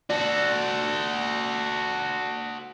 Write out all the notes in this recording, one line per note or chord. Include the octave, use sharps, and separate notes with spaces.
F#4 A4 D5